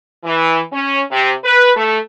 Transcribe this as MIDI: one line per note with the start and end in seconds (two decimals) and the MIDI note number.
0.25 0.60 52
0.72 1.02 61
1.11 1.31 48
1.44 1.70 71
1.75 1.98 57